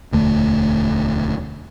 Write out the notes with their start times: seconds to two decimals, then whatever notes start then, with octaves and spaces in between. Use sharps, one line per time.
0.12 E1 D2 A3